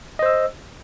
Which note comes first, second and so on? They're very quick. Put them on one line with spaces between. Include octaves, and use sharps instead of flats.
D#5 C5 E6